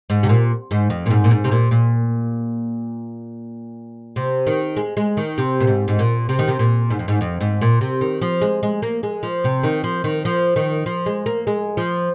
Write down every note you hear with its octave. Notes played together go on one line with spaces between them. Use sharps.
G#2
C3
A#2
G#2
F2
A#2
G#2
A#2
G#2
C3
A#2
A#2
C3
D#3
G#3
G#3
D#3
C3
A#2
G#2
G#2
A#2
C3
D#3
C3
A#2
G#2
F2
G#2
F2
G#2
A#2
C3
D#3
F3
G#3
G#3
A#3
G#3
F3
C3
D#3
F3
D#3
F3
D#3
F3
G#3
A#3
G#3
F3